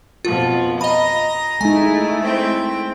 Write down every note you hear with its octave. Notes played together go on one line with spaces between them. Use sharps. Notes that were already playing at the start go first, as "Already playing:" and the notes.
F2 B2 F3 F4
D#5 A#5 B5 D#6 A#6
G#3 A3 D#4 E4 G#5
C4 G5